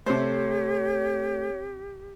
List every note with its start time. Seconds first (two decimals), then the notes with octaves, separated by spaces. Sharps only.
0.06 C3 A3 G4 C5 C#5